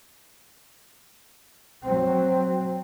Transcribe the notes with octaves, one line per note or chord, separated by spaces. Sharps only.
F#3 C4